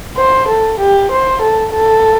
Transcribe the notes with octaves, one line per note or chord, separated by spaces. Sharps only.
C5
A4
G4
C5
A4
A4